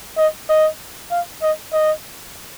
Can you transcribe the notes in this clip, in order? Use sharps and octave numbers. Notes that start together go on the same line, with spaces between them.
D#5
D#5
F5
D#5
D#5